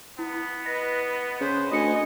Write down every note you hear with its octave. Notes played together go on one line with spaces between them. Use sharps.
B3 E4
B4 D#5 A#6
C#3 B4 C5
D2 D#5 G#5 D#6 C#7